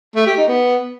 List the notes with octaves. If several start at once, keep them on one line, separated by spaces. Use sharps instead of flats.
A3
G4
D#4
B3